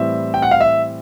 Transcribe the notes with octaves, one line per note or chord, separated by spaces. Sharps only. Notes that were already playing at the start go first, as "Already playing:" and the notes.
Already playing: A2 E3 G3 C4 E5
G5
F#5
F5
E5